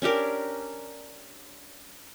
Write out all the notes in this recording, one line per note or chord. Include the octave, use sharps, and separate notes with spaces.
C#4 D4 G4 A#4